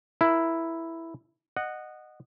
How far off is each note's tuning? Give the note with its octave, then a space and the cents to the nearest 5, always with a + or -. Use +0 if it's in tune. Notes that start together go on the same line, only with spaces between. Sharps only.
E4 +0 A#4 +10
D#5 -20 F#5 +0